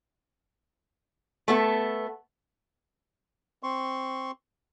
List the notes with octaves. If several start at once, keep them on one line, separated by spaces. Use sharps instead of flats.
A3 B3 A4
C4 C6 C#6